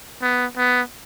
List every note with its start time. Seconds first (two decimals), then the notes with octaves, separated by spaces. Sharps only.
0.22 B3
0.57 B3